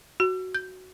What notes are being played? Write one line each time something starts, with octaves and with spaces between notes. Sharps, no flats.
F#4
G6